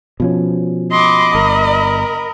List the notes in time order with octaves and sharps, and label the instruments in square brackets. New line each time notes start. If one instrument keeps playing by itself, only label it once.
[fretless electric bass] B2 F3 C#4
[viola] D#5 B5 [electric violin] C6 D6
[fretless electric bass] G1 [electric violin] A#4